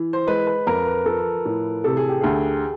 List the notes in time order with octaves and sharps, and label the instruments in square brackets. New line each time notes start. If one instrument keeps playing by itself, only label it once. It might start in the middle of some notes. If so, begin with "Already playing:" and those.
Already playing: [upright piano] E3
[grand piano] C5
[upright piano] G#3 [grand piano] B4
[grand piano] B4
[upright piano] F2 [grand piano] A#4
[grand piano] B4
[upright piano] F3 [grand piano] A4
[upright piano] A2
[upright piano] C3 [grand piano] A4
[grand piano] G#4
G4
[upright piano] D2 [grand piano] G#4